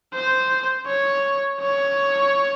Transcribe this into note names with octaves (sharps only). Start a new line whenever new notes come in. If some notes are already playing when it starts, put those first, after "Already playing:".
C5
C#5
C#5